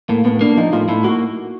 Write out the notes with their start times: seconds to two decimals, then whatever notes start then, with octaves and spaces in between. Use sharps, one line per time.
0.09 A2 A#3
0.25 A2 B3
0.41 A#3 D4
0.57 F3 D#4
0.73 A2 F4
0.88 A2 E4
1.04 A#3 F#4